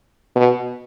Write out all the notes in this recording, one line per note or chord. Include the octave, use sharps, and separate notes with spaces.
B2